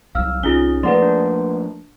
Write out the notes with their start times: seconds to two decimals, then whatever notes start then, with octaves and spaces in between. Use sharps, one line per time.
0.15 C2 F#3 F5 E6 F6
0.43 C2 C#4 D#4 F4 G#4 G7
0.83 F3 A3 A#3 G#4 B4 D5 F#5 C6
1.02 D4